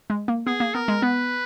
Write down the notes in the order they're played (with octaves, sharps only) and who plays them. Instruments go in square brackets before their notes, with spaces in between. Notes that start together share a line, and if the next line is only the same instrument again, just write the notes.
[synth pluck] G#3
A#3
[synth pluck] B3 [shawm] G#4
[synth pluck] A#3
[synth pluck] B3 [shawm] A#4
[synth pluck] G#3
[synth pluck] B3 [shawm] B4